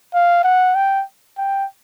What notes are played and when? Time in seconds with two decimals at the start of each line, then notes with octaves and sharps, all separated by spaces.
0.14 F5
0.44 F#5
0.75 G5
1.38 G5